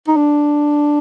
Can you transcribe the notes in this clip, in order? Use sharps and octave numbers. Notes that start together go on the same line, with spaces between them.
D#4
D4